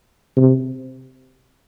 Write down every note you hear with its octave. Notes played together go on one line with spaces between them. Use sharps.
C3